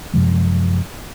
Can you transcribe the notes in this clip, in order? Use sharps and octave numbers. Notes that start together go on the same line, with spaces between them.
F#2 C3 F3 G#3